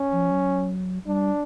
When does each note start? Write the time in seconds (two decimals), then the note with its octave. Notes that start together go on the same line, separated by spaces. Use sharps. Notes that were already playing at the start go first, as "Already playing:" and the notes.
Already playing: C#4
0.12 F3
0.31 F#3
1.06 G3 D4